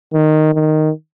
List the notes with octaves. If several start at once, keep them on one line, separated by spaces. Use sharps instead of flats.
D#3
D#3